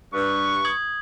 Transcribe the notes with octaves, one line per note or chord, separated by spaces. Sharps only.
G2 B4 C#6
D#6 G#6 F#7